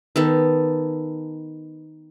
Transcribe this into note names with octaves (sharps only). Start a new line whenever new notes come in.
D#3 B3 A4